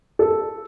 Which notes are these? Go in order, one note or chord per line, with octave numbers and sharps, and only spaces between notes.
A4